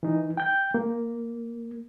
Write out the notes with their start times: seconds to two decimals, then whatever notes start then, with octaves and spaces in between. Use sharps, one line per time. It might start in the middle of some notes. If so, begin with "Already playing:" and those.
0.03 E3 D#4
0.37 G5 G6
0.74 A#3